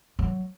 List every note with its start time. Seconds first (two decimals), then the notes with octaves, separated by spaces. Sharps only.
0.19 F#3